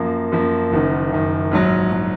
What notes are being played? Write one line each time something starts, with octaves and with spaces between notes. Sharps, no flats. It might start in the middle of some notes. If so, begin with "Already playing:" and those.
Already playing: F#2 F3 A#3
F#2 F3 A#3
F#1 F#2 D#3
F#1 F#2 D#3
A#1 G#2 F#3
F#3